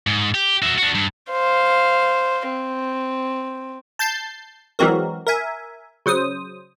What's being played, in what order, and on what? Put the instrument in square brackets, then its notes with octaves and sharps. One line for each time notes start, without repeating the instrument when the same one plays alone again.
[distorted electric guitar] G#2
G4
F#4 E5
D4 F#4
G2
[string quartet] C5 F5
C4
[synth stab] A5 G6 A6 C7
E3 F#3 G#3 C4 F#4 A#4
A#4 E5 G#5
C#3 F#3 C5 D#6